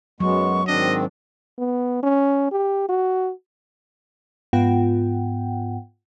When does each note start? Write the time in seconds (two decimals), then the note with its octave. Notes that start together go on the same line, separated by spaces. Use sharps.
0.20 F#2 F#3 G#3 B3 C#6
0.67 G#2 D#3 C4 D4 D#5
1.58 B3
2.03 C#4
2.52 G4
2.89 F#4
4.53 G#2 B3 F4 F#5 G5